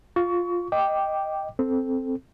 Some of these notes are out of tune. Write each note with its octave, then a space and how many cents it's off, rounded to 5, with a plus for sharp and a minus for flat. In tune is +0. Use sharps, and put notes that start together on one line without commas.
F4 +5 C#6 +25
D#5 +0 G5 +0 D6 +0
C4 +0 A4 +0